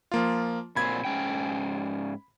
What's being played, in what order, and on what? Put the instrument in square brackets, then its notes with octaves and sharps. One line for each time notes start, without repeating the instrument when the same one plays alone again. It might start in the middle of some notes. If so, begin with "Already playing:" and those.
[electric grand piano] F3 A#3 F4
[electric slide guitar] A#2 C4 [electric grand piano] B5 G#6
[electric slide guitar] G#2 C#4 G5